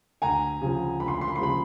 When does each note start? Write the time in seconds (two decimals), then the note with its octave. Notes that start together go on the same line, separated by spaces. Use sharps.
0.22 D2 G#5 A#5
0.62 C#3 F3
1.00 D2 B5
1.08 C6
1.15 B5
1.21 C6
1.28 B5
1.36 C6
1.39 C#3 F3 B5